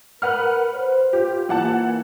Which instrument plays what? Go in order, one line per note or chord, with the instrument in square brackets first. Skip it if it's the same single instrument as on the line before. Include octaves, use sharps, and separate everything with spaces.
[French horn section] A#4 [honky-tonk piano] B4 F#5 F6
[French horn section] C5
[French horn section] F4 [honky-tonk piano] G4
[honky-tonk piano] E3 F#5 A5 [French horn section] A#3